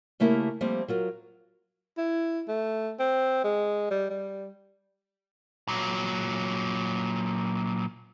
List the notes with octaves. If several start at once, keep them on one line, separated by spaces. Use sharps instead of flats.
C#3 A3 A#3 E4 G4 A#4
F3 G3 A3 A#3 C4
F#3 F4 A#4
E4
A3
C4
G#3
G3
G3
A#2 F#3